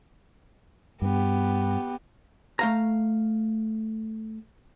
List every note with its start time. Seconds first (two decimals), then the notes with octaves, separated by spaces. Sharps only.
1.02 G2 B3 G4
2.59 A3 F5 A#5